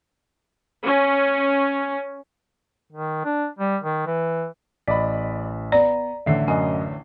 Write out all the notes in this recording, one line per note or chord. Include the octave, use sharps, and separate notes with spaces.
C#4
D#3
D4
G3
D#3
E3
A1 D5 D#5 B5 B6
B3 D5 A#5
A1 D3 A3 E5 C7
F#2 D#5 G#5